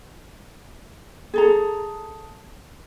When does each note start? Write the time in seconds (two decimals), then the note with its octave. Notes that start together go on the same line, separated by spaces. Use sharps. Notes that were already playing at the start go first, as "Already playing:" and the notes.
1.34 G#4 A4 A#5